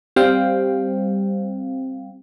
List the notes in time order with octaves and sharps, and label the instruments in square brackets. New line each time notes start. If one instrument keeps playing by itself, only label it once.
[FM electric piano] G3 C4 F5 G5